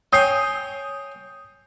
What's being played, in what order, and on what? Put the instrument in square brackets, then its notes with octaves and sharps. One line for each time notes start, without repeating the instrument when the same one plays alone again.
[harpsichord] C#5 G5 G#5 [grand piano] D#6 G6 C7